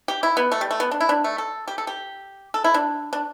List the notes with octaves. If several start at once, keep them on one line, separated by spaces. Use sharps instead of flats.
G4
E4
B3
A3
G3
A3
B3
D4
E4
D4
A3
A4
G4
A4
G4
A4
E4
D4
D4